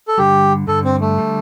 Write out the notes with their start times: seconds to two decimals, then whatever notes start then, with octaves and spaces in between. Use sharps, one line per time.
0.08 A4
0.18 G2 D3 G3 G4
0.67 G2 D3 G3 A4
0.84 C4
1.00 A3
1.18 D3 G3